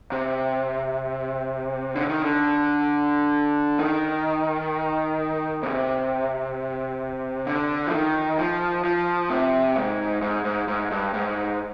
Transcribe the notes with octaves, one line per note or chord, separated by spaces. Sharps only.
C3
D3
D#3
D3
D#3
C3
D3
F3
D#3
F3
F3
C3
G#2
G#2
G#2
G#2
G2
G#2